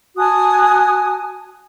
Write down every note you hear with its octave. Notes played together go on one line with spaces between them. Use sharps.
F#4 G#5 A5 D#6